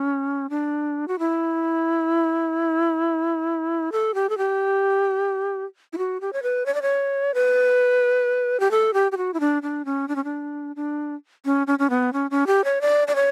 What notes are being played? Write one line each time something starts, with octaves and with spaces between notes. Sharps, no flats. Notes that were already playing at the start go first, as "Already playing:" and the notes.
Already playing: C#4
D4
F#4
E4
A4
G4
A4
G4
E4
F#4
G4
C#5
B4
C#5
D5
C#5
B4
G4
A4
G4
G4
F#4
E4
D4
D4
C#4
D4
C#4
D4
D4
C#4
C#4
C#4
B3
C#4
C#4
G4
C#5
D5
D5
C#5